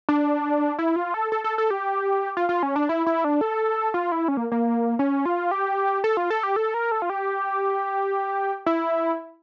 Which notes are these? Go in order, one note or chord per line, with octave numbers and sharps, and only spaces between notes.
D4
E4
F4
A4
A4
A4
A4
G4
F4
F4
C#4
D4
E4
E4
D4
A4
F4
E4
C#4
A#3
A#3
C#4
F4
G4
A4
F4
A4
G4
A4
A#4
A4
F4
G4
E4